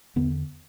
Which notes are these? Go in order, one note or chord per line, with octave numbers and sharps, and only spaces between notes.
E2 D3 B3